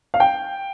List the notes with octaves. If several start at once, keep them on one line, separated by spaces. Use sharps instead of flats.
F5
G5